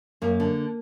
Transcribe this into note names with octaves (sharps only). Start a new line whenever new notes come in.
F#2 A#3
D3